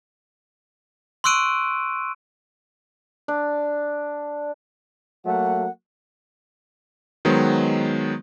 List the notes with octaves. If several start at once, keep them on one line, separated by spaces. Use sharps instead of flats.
C6 C#6 E6 F#6 D7 D#7
D4
F#3 A3 A#3 F#5
D#3 F#3 G#3 B3 C5